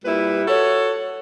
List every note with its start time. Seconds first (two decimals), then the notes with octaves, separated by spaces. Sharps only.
0.04 A#2 G3 E4 B4
0.48 F#4 A4 C#5